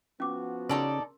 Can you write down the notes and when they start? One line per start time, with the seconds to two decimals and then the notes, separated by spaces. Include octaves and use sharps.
0.20 F3 B3 C#4 F#4 D6
0.69 C#3 D#4 A4 A#4 D5 C6